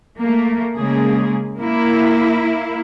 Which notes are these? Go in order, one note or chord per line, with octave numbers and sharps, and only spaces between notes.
A3 A#3
C#3 G#3 A#3 G#4
A#3 E4